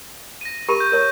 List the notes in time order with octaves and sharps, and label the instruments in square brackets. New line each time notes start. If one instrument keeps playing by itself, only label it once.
[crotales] A#6 D#7
[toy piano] G4 A#4 B5 [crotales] C#6 D#7
[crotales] G6
[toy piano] A#4 C#5